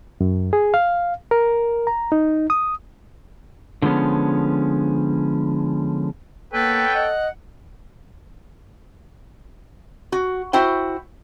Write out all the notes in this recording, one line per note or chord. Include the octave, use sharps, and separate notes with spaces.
F#2
G#4
F5
A#4
A#5
D#4
D#6
D3 F3 G#3 B3 C#4
A#3 B3 A4 B4 C#5 G5
D#5 F#5
F#4
E4 F#4 C5 G5